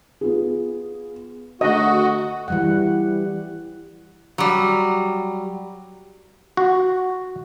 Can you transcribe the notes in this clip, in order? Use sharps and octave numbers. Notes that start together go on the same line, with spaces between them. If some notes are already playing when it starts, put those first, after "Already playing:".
B3 F4 G#4
D3 A3 F#4 D#5
E3 G3 F#5
F#3 G3
F#4